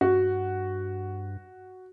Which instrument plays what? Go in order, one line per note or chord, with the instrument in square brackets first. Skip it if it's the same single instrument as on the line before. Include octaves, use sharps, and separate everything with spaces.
[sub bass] G2 [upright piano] F#4